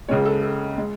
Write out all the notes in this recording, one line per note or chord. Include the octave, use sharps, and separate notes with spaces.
C#2 C#3 G#3 C#5
A4
A4
G#3